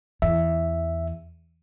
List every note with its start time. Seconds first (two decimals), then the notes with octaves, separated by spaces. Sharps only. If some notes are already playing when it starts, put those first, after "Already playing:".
0.22 E2 E5